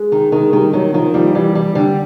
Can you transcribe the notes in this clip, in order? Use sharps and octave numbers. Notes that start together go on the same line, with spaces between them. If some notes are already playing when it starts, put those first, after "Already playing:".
Already playing: G#3
D#3
D#3 G#3
D#3 G3
D#3 F#3
D#3 F3
F3 G3
E3 G3
G3
D3 G3